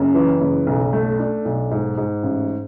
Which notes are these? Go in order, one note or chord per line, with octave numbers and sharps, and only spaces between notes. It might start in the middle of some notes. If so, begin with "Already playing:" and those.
Already playing: F#1 F#2
E3
F#1
B1
A3
D4
B1
G#2
G#2
A1